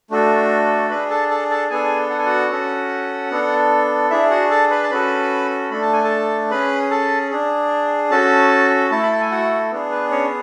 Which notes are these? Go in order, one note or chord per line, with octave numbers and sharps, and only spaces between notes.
A3 D4 F#4 A4
D4 G#4 B4 B5
A4 A5
A4 A5
A4 A5
B3 D4 G#4 A4 G#5
F#5
G#5
F#4 F#5
C#4 F#4 A4
B3 D4 A4
D4 E4 G#4 E5
F#4 F#5
A4 A5
B4 B5
A5
C#4 F#4 A4 B4 B5
A3 D4 A4 B5
A5
G#5
A4 A5
C#4 G#4 B4 B5
A4 A5
D4 G#4
C#4 F#4 A4 A5
A3 E4 A4 A5
B5
A5
G#5
F#4 F#5
B3 D4 G#4
B4
C#4 C#5